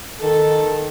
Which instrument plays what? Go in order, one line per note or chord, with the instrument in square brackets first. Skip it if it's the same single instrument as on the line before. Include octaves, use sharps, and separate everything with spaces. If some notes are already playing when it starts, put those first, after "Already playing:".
[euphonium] D#3 [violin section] A4